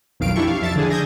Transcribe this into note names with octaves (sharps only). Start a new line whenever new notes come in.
B1 F2 D#3 F5 D7
D4 E4 G4 A4 C#6
F5
F2 E5 A5 A6
D3 D4 G#4
D#6 G6 G#6 A#6